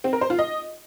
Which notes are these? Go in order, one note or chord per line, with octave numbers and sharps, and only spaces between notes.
C4
A#4
C5
F4
D#5